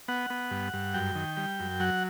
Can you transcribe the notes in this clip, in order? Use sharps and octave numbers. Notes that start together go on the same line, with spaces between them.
B3 F#5
B3
G2
G2
F#2 G5
D#3
G3
F#2
F#3 F#5